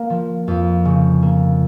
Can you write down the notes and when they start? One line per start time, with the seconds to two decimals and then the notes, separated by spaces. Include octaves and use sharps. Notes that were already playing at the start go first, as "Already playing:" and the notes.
Already playing: A#3
0.10 F3
0.48 F2
0.85 C#3
1.22 A#3